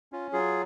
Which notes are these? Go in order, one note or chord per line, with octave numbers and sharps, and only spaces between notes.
C#4 F4
F#3 F4 G#4